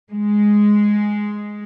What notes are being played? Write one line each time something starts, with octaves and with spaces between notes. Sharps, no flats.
G#3